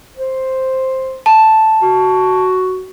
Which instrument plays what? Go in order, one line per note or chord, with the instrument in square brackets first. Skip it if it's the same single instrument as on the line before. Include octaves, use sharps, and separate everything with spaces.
[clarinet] C5
[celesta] A5
[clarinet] F#4